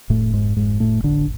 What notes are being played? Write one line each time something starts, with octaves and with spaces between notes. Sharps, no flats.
F1 A2 A3
G#2 G#3
F1 G#2 G#3
A2 A3
A1 D3 D4